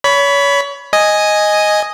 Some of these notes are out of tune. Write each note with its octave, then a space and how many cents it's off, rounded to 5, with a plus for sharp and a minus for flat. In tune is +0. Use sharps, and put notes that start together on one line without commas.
C#5 +30 B5 +0
D#5 +0 G#5 +0